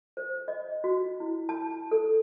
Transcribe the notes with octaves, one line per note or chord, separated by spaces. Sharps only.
C5
D#5
F#4
E4
A5
A4